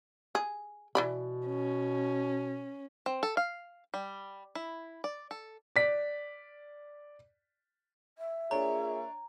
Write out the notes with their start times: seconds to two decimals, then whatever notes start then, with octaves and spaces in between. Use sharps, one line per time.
0.35 G#4
0.95 B2 E3 D5 B5
1.47 C#4
3.06 C4
3.23 A4
3.37 F5
3.94 G3
4.55 E4
5.04 D5
5.31 A4
5.76 D5 B6
8.18 E5
8.51 A#3 D4 F4 G#4 C#5 A#5